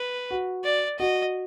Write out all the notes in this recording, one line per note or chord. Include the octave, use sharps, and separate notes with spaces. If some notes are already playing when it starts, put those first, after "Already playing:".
Already playing: B4
F#4
D5
F#4 D#5